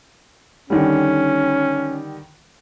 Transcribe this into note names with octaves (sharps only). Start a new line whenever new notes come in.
D3 D#3 G3 C#4